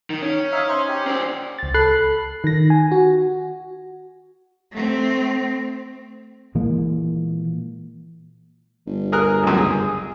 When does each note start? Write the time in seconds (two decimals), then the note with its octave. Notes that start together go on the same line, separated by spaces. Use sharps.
0.10 D#3
0.22 C#4
0.52 D#4 E5 F5
0.68 D#4 C5
0.89 G4
1.07 D4 C5
1.59 C#2 A6
1.74 A4 B5 F#6 C7
2.44 D#3 A#6
2.70 G#5
2.92 F#4
4.73 A3 C4
6.55 A#2 E3 G#3 A#3
8.87 G1
9.12 G#4 A#4 F#6
9.43 C#2 F#2
9.57 G#4